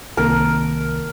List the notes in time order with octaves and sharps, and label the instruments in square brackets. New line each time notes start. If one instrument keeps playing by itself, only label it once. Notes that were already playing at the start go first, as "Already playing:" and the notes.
[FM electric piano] C2 C3 D#3 A#3 [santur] A#4